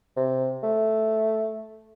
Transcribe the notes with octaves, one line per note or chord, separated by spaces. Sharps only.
C3
A3